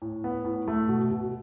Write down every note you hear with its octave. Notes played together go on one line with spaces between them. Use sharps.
A2
B3
A2
A3
B2
B2